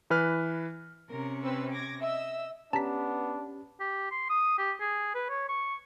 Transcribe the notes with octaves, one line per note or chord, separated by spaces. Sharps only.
E3 B4 F6
C3 C#4 A#4
C4 B4 E6
D6 G#6 A#6
D#5 E5 E6
B3 C#4 D4 G4 A5 A#5 B6
G4
C6
D#6
G4
G#4
B4
C#5
C#6